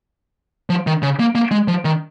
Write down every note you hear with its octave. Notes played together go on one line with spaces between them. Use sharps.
F3
D#3
C#3
A#3
A#3
G#3
F3
D#3